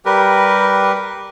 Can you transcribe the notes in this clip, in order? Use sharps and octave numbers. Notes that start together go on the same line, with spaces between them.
G3 G4 A#4 B4